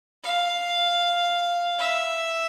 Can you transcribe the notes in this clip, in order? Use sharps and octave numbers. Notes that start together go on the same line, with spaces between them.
F5
E5